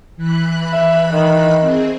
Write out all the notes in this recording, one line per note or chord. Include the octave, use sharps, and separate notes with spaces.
E3 B5 F#6
E5
D#3
C4 G#4